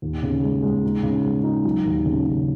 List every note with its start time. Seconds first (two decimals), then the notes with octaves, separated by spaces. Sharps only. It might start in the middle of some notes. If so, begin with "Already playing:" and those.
0.02 D#2
0.23 C#3
0.43 G#3
0.62 G#3
0.83 D#4
1.03 C#3
1.25 G#3
1.44 D#4
1.65 F#3
1.85 D#2
2.05 C#3
2.26 C#3